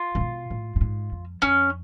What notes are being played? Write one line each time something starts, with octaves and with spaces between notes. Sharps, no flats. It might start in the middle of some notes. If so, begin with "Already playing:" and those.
Already playing: F4
A2
B2
A2
A2
G#2
F2
F2 C#4